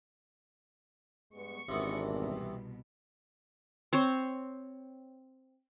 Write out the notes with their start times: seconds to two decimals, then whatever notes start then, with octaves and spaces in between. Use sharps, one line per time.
1.33 G2 G#3 B3 C#6
1.69 G#1 C3 E3 B3 C#4 D4 A#4
2.07 C2 B2
3.93 C4 C5 C#5